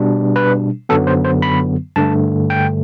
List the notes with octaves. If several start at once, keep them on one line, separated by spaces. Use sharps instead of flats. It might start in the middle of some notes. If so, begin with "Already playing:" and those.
Already playing: B2 G3 D4
B4
F#2 D3 F#3 B3 A4
C5
C5
B5
G2 D3 A3 A5
G5